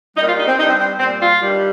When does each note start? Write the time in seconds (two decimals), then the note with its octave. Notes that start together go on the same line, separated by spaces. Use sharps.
0.16 G3 D#4
0.21 A#2
0.27 F4
0.37 D#4
0.47 C4
0.58 G2 G3 D#4
0.68 C4
0.78 C4
0.99 A#2 G3 C4
1.19 F4
1.41 G2 D#3 G3